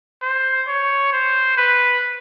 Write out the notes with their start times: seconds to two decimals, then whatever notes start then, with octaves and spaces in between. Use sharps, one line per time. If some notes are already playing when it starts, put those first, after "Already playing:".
0.22 C5
0.68 C#5
1.12 C5
1.57 B4